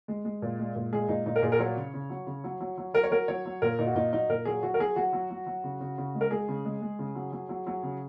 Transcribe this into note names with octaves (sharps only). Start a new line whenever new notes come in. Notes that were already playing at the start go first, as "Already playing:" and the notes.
G#3
G#3
A#2
G#3
A#2
G#3 G#4
A#2 D#4
A#2 D#4
A#4
A#2 G#4
A#4
F#3 C#5
C#3
C#3
F#3
C#3
F#3
F#3
F#3
F#3 A#4
C#5
F#3 A#4
F#3 C#5
F#3
A#2 A#4
A#2 D#4
F#4
A#2 D#4
F#3 D#4
A#2 A#4
F#3 G#4
F#3 F#4
A#4
F#3 G#4
F#3 F#4
F#3
F#3
F#3
C#3
C#3
C#3
G#3
A#4
G#3 G#4
C#3
G#3
G#3
C#3
F#3
F#3
F#3
F#3
C#3